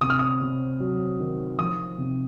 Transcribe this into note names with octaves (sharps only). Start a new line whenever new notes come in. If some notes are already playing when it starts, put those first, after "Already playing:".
C3 D#6
F6
D#6
C3
F#3
D#3
F3 D#6
C3